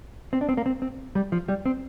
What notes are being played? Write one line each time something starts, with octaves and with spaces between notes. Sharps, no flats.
C4
D4
C4
A#3
C4
C4
G3
F3
G3
C4